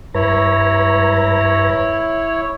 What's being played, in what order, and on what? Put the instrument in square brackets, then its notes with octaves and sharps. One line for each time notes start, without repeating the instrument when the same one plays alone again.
[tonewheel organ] G2 B4 A#5 [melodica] E4 C#5